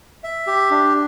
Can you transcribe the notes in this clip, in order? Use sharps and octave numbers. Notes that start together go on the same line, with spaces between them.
E5
G4
D4